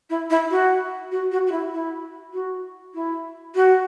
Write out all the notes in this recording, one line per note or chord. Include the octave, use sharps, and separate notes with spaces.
E4
E4
F#4
F#4
F#4
F#4
E4
E4
F#4
E4
F#4